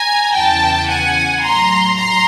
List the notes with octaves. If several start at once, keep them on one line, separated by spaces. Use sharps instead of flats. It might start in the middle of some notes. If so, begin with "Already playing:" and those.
Already playing: G#5 A#5
E2 C#3 E3 G5 A5
F#5 G#5
A2 F#3 A#5 C6
A#5 C6